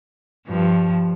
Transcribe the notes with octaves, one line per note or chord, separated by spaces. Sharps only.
G2 F3